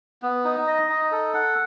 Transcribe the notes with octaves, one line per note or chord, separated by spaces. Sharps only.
B3
D#4
D#5
D#4
A4
F#5